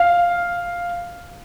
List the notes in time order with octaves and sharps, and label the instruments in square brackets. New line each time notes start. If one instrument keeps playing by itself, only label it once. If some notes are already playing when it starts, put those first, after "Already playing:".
Already playing: [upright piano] F5